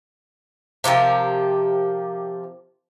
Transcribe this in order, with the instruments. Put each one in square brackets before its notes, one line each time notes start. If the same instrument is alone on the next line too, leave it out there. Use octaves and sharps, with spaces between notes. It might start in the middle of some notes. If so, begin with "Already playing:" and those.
[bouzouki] C3 F3 G4 A#4